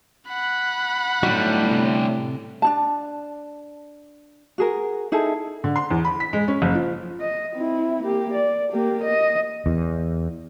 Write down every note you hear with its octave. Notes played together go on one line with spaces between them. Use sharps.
F#5 B5
A2 D3 F#3 G3 D#4 F#4
C3
D4 D#4 A5
F#4 G#4 A#4
D#4 E4 G#4 A4
D3
C6
E2
B5
B6
G#3
C#4
F#1
F3
D#5
C4 E4
A#3 G4
D5
A#3 G4
D#5
E2